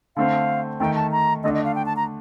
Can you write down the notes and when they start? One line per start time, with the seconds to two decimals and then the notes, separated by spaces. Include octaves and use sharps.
0.17 D3 A3 C4 F5
0.80 D#3 A3 D#4 G5
0.96 A5
1.12 A#5
1.44 D3 A3 D4 D#5
1.54 D#5
1.65 F5
1.75 G5
1.86 A5
1.96 A#5